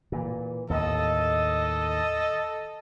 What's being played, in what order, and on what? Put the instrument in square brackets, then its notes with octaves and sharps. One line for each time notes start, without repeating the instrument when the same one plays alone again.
[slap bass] A#2 E3
[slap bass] D#2 A2 [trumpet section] A4 D#5